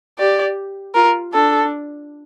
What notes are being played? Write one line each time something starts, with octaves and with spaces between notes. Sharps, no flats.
G4 D5
F4 A#4
D4 A4